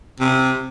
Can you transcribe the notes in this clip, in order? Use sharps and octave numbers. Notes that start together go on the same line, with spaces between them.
C3